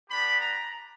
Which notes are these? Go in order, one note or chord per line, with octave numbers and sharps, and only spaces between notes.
B3 D4 G4 B5
A#5